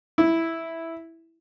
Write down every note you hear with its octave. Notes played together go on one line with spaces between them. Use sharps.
E4